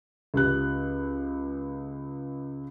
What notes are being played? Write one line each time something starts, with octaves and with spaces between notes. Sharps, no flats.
C#2 G4 F#6